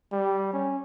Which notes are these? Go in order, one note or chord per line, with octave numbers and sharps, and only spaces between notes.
G3
C#4